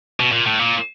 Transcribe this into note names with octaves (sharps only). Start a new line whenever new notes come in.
B2
A#2
A2
A#2